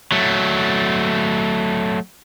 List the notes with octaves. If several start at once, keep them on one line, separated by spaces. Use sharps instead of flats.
F#3 A3